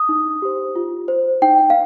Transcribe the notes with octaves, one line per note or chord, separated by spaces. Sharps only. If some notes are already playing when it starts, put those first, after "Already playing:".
Already playing: D#6
D#4
G4 C5
F4
C5
D#4 G5
F5